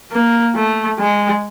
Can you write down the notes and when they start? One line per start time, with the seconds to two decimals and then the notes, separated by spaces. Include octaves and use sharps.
0.12 A#3
0.55 A3
0.99 G#3